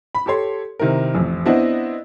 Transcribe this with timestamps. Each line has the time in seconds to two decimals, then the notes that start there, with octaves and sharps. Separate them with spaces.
0.15 B5
0.26 G4 A4 C#5 C6
0.79 C3 D#3 E4 A#4
1.15 A1 F2
1.46 B3 C4 D4 E4 D5 D#5